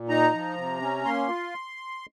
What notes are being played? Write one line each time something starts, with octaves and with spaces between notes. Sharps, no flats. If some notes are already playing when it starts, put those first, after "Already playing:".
Already playing: A#2
D#4 A#5
F3
C3
C#4
A#3 C6
F4